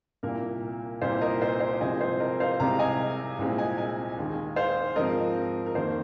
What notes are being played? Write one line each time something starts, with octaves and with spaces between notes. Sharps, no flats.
C2 A#2 A#3 A#4
C2 A#2 A#3 C5
A#4 D#5
C5
C5
C2 C3 F3 G#3 C4 D#5 G#5
C5
A#4 D#5
C5 F5
C2 C3 G#3 C4 F5 A#5
D#5 G#5
C2 A#2 G#3 C4
D#5 G#5
D#5 G#5
D#2 D#3 G#3
C5 F5
G#2 F3 C4 A#4 D#5
A#4
F2 D#3 A#3 C5